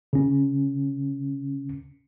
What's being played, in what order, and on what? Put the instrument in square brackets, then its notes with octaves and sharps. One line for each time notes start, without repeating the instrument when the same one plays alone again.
[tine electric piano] C#3 C#4